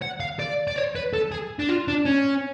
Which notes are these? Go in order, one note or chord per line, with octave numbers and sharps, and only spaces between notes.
F#5
F5
D5
D5
C#5
B4
A4
G#4
D4
F4
D4
C#4